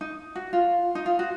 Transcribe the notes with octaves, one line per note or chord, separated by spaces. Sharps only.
D#4
F#4
F4
D#4
F4
F#4